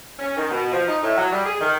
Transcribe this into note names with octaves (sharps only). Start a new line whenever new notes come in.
C#4
D#3
B2
F3
D#4
A2
F#3
G3
G#4
D#3